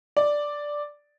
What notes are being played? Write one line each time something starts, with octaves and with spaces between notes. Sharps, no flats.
D5